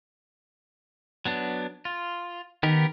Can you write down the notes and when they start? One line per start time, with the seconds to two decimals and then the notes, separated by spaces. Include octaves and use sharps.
1.25 F#3 B3 D4
1.85 F4
2.63 D#3 B3 G4 A#4